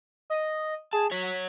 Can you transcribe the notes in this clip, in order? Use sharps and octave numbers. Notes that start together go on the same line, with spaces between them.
D#5
G#4 A5
F#3 C#5 B6